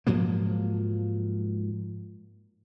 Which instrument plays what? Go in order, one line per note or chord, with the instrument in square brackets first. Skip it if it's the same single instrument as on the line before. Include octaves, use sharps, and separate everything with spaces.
[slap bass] G#2 F3 F#3 A#3